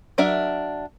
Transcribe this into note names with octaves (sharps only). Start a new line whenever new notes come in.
F#3 D4 A#4 E5